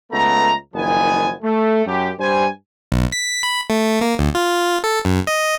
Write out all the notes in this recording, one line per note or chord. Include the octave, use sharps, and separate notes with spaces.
C#2 A3 B3 A#5
F#1 D#3 F3 B3 G#5
A3
F#2 G4
G2 G3 C5 G#5
B1
B6
B5
A3
A#3
D2
F4
A4
F#2
D#5